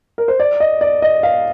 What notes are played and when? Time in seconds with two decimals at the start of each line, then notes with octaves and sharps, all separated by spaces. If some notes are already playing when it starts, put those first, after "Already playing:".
0.18 A#4
0.28 C5
0.40 D5
0.60 D#5
0.81 D5
1.02 D#5
1.23 F5